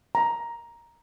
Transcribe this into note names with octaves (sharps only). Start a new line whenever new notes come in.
A#5